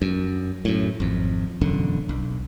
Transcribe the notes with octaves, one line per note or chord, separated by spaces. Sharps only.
F#2
F#2 A2
G#1 F2
E1 F#2 D3
B1